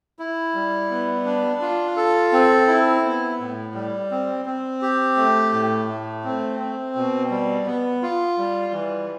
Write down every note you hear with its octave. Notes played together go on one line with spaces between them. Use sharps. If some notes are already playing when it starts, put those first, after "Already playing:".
E4
G3
B3
D4
F4
A4
C4
E4
B3
A2
G3
C4
C4
G4
A3
A2
A3
C4
C4
B2
G3
B3
F4
G3
E3